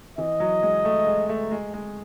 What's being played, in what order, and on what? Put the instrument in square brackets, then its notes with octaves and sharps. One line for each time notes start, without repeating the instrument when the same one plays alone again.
[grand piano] E3 [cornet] D#5
[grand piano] F#3
G#3
A3
G#3
A3
G#3
G#3